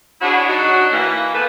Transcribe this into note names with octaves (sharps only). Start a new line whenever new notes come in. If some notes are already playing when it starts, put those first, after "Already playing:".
D4 E4 F#4 G#4 C#5
F#3 D4 D#4 F#4
E3 A#3
C3 E3 A#3 B3 A4 B4